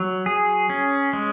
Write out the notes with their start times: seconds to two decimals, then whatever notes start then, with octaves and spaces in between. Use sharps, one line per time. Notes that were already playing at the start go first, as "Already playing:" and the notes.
Already playing: F#3
0.26 G#4
0.70 C#4
1.13 G#3